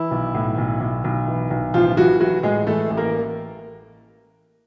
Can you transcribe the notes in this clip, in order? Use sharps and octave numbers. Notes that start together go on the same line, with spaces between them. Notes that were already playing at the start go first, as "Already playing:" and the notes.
Already playing: E3 E4
B1
A2
B1
B1
B1
E3
B1
A1 F3 F4
E3 F#3 F#4
E3 F#3 F#4
A2 G#3 G#4
E3 A3 A4
A1
A#3 A#4